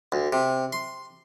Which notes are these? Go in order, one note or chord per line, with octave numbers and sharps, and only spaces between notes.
D2
C3
C6